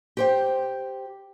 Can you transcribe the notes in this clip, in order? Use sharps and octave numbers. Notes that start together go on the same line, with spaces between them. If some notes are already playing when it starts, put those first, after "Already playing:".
G4 C5 G5